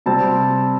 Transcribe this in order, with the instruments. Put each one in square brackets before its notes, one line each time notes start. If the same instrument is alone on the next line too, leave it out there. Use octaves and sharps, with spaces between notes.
[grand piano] C3 G3 C4 A5